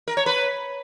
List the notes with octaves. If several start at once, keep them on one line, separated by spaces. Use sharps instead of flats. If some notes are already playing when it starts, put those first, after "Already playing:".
A#4
C#5
B4